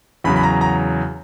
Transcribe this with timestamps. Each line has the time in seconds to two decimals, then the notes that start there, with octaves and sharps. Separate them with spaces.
0.24 E2 C#3 F#3 B5
0.36 B5
0.43 A#5
0.61 A#5